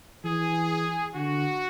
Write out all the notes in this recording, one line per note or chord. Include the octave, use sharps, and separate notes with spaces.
E3 G#4
D3 F#4